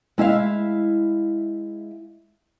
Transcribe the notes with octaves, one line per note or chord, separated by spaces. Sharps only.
G#3 E4 E5 F5